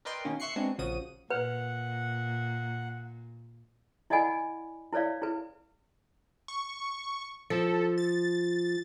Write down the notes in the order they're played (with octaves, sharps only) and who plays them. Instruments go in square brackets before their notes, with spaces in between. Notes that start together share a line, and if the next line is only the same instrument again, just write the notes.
[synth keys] A#4 B4 D5 D#5 G5 C6
B2 D#3 A#3 C#4
E5 C6 C#6 F#6 C7 C#7
G#3 B3 C4 D4 F#4
A#1 C#3 F3 F#4 D#6 D#7
[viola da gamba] A#2 [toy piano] B4 [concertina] F#5
[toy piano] E4 D5 D#5 F#5 G#5 B5
E4 B4 C#5 D5 F5
E4 B4
[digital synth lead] C#6
[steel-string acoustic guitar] F3 [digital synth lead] A4
[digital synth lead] A6